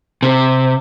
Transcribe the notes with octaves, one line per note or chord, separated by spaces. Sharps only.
C3